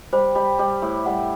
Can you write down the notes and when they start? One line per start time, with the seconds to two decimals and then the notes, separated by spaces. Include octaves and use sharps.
0.13 G3 C5
0.35 G3
0.59 G3
0.82 A2
1.06 G3 F#5